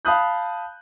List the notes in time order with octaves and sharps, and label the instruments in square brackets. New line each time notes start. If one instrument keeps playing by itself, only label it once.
[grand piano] F5 A5 B5 D#6 F#6 G6